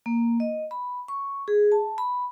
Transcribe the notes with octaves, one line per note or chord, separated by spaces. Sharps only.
A#3
D#5
B5
C#6
G#4
A5
B5